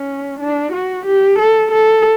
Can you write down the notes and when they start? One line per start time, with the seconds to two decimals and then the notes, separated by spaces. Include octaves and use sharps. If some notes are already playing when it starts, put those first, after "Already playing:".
Already playing: C#4
0.40 D4
0.73 F#4
1.05 G4
1.39 A4
1.72 A4